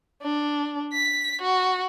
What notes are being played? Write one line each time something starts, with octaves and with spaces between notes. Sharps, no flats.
D4
B6
F#4